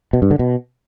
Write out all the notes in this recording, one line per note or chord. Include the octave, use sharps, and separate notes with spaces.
B2
G2
D3
B2